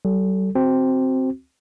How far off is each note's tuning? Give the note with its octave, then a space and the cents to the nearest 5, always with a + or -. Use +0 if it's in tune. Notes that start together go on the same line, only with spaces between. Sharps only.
G3 -45 A4 +0
C4 +0 F#4 +10